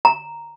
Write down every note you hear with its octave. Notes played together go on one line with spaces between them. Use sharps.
A#5